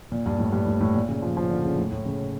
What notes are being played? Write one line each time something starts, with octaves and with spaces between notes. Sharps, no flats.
A#2
G2
A2
G2
A2
A2
A#2
C#3
F3
F3
D3
C#3
A2
A2
C#3